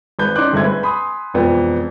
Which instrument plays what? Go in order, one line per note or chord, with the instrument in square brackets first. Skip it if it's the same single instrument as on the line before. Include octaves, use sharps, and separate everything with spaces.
[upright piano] G#1 B4 G6
C#4 D#4 D5 C6 D6 F#6
G1 G#3 A3 C4 G#6
B4
G#5 B5 C6 D#6
E1 F2 B3